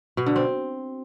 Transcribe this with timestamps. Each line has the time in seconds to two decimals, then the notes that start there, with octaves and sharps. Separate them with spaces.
0.17 B2
0.26 D3
0.36 C4